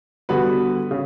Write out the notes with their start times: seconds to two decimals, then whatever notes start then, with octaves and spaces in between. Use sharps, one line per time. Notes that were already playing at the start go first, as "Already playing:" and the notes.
0.29 D3 G3 B3 F#4 B4
0.91 C#3